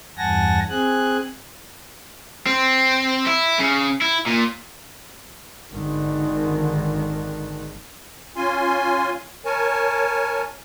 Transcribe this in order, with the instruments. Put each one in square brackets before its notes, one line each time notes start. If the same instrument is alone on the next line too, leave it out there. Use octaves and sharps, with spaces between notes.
[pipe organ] E2 G2 F#5 G#5 A5 A#6
C4 G#4 G#5 F#6
[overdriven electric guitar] C4
E4
C#3
E4
A#2
[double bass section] G#1 D3 D#3
[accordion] C#4 F4 G#5 C6
A#4 C#5 G#5 A5